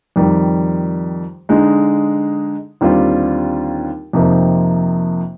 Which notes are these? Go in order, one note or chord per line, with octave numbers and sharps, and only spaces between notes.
F2 D#3 G3
D3 G#3 D#4
D#2 D3 G3 C4 F4
F2 C3 F3 A#3 D#4